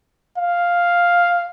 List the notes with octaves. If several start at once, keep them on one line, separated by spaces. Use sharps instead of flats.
F5